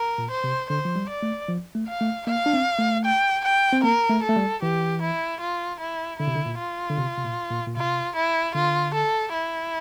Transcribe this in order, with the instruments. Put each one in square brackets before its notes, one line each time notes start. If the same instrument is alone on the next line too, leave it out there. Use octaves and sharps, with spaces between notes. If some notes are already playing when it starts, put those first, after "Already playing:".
Already playing: [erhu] A#4
[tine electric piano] A#2
[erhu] C5
[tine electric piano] C3
[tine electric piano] D3 [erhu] C5
[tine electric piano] F3
G3
[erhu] D5
[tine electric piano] A3
F3
A3
[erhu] F5
[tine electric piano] A3
[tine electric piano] A#3 [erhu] F5
[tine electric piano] D4
C4
A3
[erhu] G5
G5
[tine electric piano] C4
[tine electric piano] A#3 [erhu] A#4
[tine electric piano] A3
[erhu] A4
[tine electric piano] A3
G3
[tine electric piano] E3 [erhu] G4
[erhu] E4
F4
E4
[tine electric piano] D3 [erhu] E4
[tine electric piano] C3
D3
A#2
[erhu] F4
[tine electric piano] D3
C3
C3
A#2
A#2
A#2
[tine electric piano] C3 [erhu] F4
[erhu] E4
[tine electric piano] D3 [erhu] F4
[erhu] A4
E4